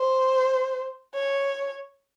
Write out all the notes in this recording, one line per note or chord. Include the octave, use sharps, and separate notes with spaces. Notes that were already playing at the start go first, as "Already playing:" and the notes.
Already playing: C5
C#5